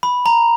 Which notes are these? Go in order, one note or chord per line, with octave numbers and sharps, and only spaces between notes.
B5
A#5